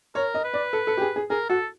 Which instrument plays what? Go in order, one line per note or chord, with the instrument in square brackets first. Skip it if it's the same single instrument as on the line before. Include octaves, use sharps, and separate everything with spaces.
[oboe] A#4 [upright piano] C#5
[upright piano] D#5
[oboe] B4
[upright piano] D5
A4
A4
G4
G#4
G#4
[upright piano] G#4 [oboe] A#4
[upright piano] F#4 [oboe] A4